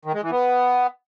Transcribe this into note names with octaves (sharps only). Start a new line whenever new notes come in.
D#3
G#3
E3
B3